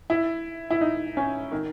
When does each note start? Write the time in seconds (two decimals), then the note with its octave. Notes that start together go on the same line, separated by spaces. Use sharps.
0.10 E4
0.70 E4
0.81 D#4
1.17 C#4
1.52 D#3